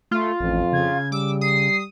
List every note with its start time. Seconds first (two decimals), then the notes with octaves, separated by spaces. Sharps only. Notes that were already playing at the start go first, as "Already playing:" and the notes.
0.11 A3 F4
0.40 A1 F2
0.73 C#3 G#6
1.12 G3 D6 E6
1.41 D#6 C7